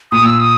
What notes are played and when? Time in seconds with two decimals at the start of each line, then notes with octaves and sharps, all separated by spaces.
0.11 A#2 D#6
0.26 E6
0.40 D#6